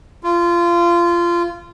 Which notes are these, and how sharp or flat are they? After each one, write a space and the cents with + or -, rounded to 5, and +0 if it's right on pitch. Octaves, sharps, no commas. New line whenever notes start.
F4 -20